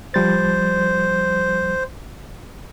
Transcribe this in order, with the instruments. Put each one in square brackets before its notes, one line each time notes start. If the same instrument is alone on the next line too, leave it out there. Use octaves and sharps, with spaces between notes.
[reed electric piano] F3 G3 A6 [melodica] C5